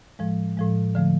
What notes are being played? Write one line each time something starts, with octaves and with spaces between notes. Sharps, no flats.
A2 F3 G#3
A2 F3 G#3
D3 F3 A3